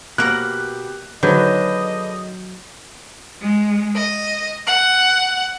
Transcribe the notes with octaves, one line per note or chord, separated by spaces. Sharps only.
B2 A#3 G4 A#4 F#5 F#6
D3 D#3 F#3 F#4 G#4 B4 D#5 G6
G#3
D#5
F#5